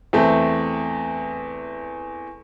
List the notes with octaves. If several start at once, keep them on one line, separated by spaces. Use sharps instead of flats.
E2 A3 C4